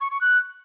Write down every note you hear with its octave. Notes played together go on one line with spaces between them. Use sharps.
C#6
C#6
F#6